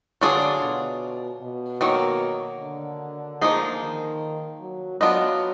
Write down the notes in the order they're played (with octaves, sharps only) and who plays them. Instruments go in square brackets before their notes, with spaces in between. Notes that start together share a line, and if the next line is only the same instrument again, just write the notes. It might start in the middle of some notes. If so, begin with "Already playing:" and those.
[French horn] D3 [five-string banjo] F#3 D4 F4 G#4 D5
[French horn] B2
B2
[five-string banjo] D#3 F#3 A#3
[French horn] D3
[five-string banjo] F3 A#3 D#4 G#4
[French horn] D#3
F#3
[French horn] F#3 [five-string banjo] B3 D4 F4 B4 D#5